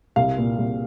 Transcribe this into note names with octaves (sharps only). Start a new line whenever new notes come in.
C2 F5
A#2
C2